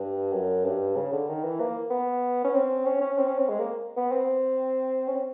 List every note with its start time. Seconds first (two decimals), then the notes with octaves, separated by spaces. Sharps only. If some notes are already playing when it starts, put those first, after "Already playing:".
Already playing: G2
0.33 F#2
0.65 G2
0.96 C#3
1.13 D3
1.28 D#3
1.44 E3
1.60 A#3
1.90 B3
2.44 C#4
2.54 C4
2.85 C#4
3.01 C#4
3.18 C4
3.28 C#4
3.38 C4
3.49 G#3
3.59 A#3
3.97 B3
4.11 C4
5.07 C#4
5.15 C4